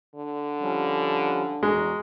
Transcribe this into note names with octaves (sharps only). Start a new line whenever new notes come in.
D3
F3 G3 C#4
E2 G#3 F#4 A#5